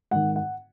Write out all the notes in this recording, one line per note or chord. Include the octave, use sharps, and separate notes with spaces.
G#2 D#3 F#5
F#5